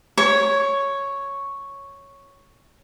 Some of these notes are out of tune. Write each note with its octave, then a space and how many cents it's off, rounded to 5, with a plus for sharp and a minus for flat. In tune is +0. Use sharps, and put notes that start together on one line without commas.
C#5 +0 C#6 +45